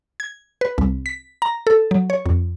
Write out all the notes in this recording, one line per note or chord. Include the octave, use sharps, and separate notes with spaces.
G#6
B4
C2
B6
A#5
A4
F#3
C#5
F2